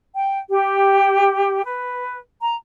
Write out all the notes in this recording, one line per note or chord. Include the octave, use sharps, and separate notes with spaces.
G5
G4
B4
A#5